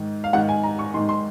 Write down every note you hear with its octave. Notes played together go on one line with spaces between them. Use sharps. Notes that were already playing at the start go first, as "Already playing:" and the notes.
Already playing: G#2 D#3
F5
G#2 D#3 F#5
G#5
A#5
C#6
G#2 D#3 C6
C6